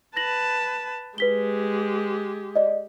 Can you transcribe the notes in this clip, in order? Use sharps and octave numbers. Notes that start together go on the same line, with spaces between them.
B4 A5 A#6 F#7
G#3 G4 B4 B6 G7
D5 D#5